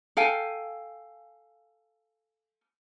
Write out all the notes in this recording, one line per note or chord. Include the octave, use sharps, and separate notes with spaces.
A4 F5 G5 G#5